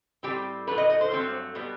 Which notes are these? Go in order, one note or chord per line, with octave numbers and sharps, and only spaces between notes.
A2 G3 C4 G4
A2 F#3 A3 B4
D#5
D#5
C5
G2 F#3 A3 C4
B2 G3 B3